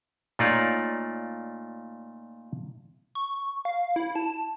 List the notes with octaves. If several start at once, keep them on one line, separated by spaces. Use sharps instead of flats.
A#2 A3 D#4 F4 C#5 D5
C#6
F5
E4
A5